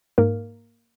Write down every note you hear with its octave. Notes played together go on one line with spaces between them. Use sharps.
G#2 A#3 A#4